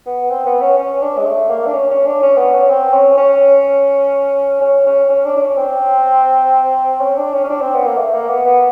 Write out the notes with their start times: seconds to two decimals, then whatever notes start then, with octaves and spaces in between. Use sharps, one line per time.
0.06 B3
0.30 C4
0.46 B3
0.62 C#4
0.78 C#4
1.02 D4
1.18 G#3
1.25 A3
1.50 A#3
1.66 D4
1.74 C#4
1.90 C#4
2.06 D4
2.22 C#4
2.37 B3
2.54 C#4
2.70 C4
2.93 C#4
3.17 C#4
4.61 C#4
4.86 C#4
5.10 C#4
5.25 D4
5.36 D4
5.42 C#4
5.58 C4
7.01 C#4
7.17 D4
7.33 C#4
7.44 C#4
7.49 D4
7.61 C4
7.74 B3
7.86 A#3
7.98 A3
8.14 A#3
8.29 B3
8.45 B3